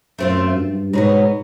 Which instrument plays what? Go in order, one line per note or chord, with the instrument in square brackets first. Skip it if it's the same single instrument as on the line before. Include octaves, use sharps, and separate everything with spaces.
[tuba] F#2 [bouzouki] A3 C4 F4
[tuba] G2
[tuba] G#2 [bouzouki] B2 F#3 B3